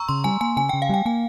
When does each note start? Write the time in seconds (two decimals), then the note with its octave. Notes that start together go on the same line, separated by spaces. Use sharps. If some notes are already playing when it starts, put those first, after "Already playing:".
Already playing: A#5 C#6 E6
0.08 C#3 C6
0.24 G3 G#5
0.41 A#3 G#5
0.57 C#3 G#5
0.69 C#3 G5
0.82 F5
0.89 G3 G5
1.05 A#3 G#5